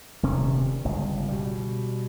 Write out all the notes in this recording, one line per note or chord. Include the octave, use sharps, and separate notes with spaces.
D#1 C3 C#4
G1 C#2
B2 G3